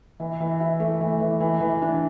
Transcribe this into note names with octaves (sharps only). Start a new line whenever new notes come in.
E3
E3
E4
A3
E3
E3
E3
E3
D4